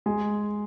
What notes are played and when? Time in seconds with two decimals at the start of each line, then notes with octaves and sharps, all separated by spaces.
0.06 G#3 G#5